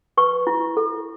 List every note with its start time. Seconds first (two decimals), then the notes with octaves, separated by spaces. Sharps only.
0.17 B4 C#6
0.47 E4
0.77 A4